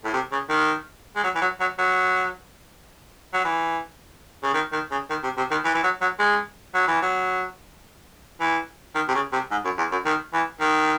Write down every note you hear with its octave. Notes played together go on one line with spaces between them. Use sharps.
A2
C3
C#3
D#3
G#3
F#3
E3
F#3
F#3
F#3
F#3
E3
C#3
D#3
D#3
C#3
D#3
C3
C3
D#3
E3
E3
F#3
F#3
G#3
F#3
E3
F#3
E3
D#3
C3
C#3
C3
G#2
F#2
E2
F#2
D#3
E3
D#3